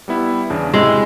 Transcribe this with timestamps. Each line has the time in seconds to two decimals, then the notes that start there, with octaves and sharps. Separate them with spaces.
0.08 G3 B3 E4
0.50 E2 C#3 D4
0.74 C3 G#3 E4 E6